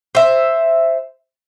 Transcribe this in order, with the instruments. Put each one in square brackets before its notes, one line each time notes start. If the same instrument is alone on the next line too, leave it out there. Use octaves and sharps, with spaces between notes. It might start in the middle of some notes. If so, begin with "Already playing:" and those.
[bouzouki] C5 E5